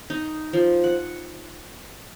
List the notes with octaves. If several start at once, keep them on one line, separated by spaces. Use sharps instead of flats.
D#4
F3
F#5